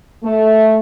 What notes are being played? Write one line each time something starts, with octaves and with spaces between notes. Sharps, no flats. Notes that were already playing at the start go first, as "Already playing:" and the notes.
A3